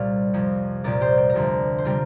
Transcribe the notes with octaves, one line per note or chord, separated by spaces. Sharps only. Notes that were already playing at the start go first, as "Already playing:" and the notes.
Already playing: C2 A#2 G3 G4 C5 D5 F5
F2 C3 F3
C2 A#2 F3 A#4 D5
G4 C5
G4
A#4
D2 C3 F3 G4
C5
C3 G3 F4 A#4